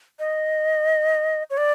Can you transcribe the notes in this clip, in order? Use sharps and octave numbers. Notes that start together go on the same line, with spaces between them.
D#5
C#5
D5